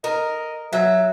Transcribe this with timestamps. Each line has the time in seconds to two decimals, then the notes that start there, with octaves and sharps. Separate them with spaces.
0.04 A#4 D#5
0.73 F#3 E5